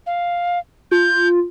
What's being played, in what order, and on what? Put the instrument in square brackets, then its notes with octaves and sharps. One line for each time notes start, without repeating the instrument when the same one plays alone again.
[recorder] F5
[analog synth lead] F4 [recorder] G6